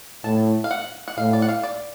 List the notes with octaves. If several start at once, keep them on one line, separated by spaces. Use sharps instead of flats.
A2 A5
F5
F#5
F#5
A2 F5
D5
F#5
F5
D5